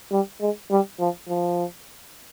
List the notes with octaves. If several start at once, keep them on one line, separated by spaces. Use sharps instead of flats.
G3
G#3
G3
F3
F3